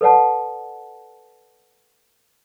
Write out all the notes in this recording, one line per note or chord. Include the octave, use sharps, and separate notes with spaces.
A4 B4 D5 F#5 A5